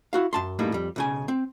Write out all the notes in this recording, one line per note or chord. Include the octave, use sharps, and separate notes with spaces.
E4 F#4 F5
F#2 A5 C6
F#2 A2 G3 A#3 D#4
F2 G3
B1 C#3 G#5
C4